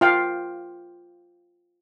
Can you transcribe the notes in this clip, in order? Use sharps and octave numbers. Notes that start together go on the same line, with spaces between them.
F4 F5 G5